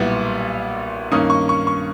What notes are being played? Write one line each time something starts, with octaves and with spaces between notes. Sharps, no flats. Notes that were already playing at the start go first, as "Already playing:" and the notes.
Already playing: B1 A#2 G3 B3 E4
G2 D#3 A#3 C#4 D#6
C#6
C#6
C#6